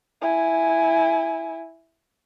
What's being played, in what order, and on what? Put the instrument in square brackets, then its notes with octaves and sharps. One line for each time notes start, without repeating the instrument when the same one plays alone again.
[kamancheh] E4 G#5